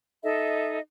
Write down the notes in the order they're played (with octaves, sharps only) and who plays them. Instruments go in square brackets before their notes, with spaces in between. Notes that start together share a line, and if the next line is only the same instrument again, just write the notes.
[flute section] D#4 A4 D#5 E5